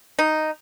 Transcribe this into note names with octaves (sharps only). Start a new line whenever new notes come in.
D#4